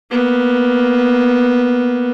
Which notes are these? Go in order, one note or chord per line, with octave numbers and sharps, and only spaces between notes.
A#3 B3